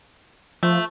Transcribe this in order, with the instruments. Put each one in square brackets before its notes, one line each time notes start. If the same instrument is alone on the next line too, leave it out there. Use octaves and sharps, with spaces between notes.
[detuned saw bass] F3 [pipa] A3